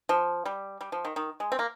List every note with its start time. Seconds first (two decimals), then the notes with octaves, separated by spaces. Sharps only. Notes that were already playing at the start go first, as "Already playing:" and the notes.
0.09 F3
0.45 G3
0.81 G3
0.92 F3
1.05 D#3
1.16 D#3
1.40 G#3
1.52 C4
1.59 A#3